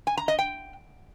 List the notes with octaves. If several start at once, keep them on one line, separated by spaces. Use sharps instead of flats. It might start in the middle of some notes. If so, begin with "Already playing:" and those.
G#5
A#5
D#5
G5